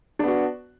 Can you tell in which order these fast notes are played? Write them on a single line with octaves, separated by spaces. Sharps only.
D4 B3 F#4